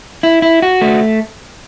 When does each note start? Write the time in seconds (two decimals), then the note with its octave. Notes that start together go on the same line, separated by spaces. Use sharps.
0.23 E4
0.42 E4
0.62 F#4
0.81 A3